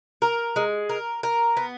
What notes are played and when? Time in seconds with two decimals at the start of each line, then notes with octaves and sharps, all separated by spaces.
0.22 A#4
0.56 G#3
0.89 A#4
1.23 A#4
1.57 B3